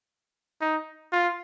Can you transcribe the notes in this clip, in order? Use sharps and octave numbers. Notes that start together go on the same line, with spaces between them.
D#4
F4